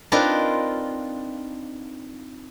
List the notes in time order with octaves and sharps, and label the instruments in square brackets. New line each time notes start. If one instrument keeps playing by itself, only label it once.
[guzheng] C4 D4 D#4 F4 A#4 B4